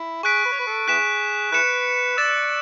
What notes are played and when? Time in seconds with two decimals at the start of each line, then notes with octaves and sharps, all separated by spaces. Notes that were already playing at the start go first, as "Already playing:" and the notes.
Already playing: E4
0.23 G#4 C#6 F#6 B6 D7
0.45 B4
0.52 C#5
0.60 B4
0.67 A4
0.88 B3 E4 G#4 F#6 B6 E7
1.52 E4 G#4 B4 F#6 C#7 E7
2.17 D5 E6 A6 E7